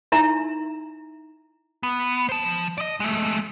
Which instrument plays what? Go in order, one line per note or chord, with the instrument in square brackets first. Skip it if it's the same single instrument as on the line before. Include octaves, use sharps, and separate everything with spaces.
[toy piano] D#4 E4 E5 A#5
[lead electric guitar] B3
C5 A5
F3
D5 D#5
G#3 A3